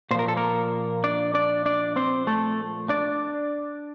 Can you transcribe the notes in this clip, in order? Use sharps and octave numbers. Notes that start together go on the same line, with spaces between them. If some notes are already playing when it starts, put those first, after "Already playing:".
A#2 F3 A#4 C5
A4
A#3 A#4
D4 D5
D4 D5
D4 D5
C4 C5
A3 A4
D4 D5